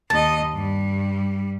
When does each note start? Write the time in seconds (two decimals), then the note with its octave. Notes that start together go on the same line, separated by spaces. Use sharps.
0.10 D#2 D#5 A5
0.53 G2 G3